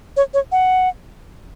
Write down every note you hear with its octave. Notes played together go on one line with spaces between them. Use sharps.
C#5
C#5
F#5